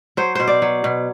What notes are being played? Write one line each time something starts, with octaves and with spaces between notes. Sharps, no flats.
F#3 C5
B2 C5
D5
F#3
B2